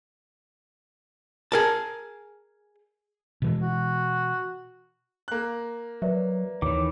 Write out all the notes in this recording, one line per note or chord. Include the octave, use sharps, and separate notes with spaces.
G#4 A#4 A5
B2 E3 G#3
F#4
A#3 F#6
F#3 B4 D5 E5
D#2 D#3 E3 C#5 D6